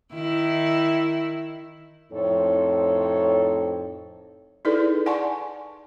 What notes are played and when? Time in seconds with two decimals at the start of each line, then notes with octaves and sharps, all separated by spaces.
0.13 D#3 E4
2.13 F2 A2 C4 D#4 A4 C#5
4.65 D#4 E4 G#4 A4 B4 D5
5.06 D5 F#5 G#5 A5 C6 C#6